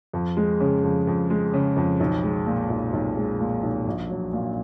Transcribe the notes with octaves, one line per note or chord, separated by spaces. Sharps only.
F2
G#3
C#3
F2
F2
G#3
C#3
F2
B1
G#3
A#2
B1
B1
G#3
A#2
B1
A#1
F#3
A#2